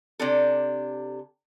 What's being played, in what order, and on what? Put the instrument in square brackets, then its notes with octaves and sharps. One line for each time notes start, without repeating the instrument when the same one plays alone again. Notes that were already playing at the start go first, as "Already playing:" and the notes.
[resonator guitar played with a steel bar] C3 D4 A4